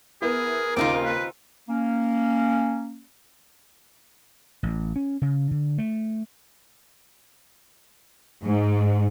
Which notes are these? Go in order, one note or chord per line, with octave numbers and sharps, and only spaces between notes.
B3 E4 G#4 A#4
D#2 C#3 C4 D#4 F4 D6
B4
A#3 C#4
A1
C#4
C#3
D3
A3
G#2